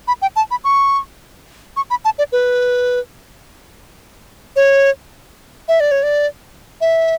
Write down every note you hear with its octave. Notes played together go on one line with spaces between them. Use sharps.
B5
G5
A5
B5
C#6
C#6
B5
A5
D5
B4
C#5
E5
D5
C#5
D5
E5